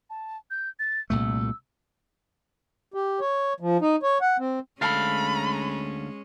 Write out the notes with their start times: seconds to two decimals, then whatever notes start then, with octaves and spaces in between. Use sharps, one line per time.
0.10 A5
0.51 G6
0.79 A6
1.10 C2 A#2 A3 E6
2.94 G4
3.20 C#5
3.60 F3
3.81 D#4
4.03 C#5
4.21 F#5
4.39 C4
4.81 D2 G#3 C#4 A4 F5 B5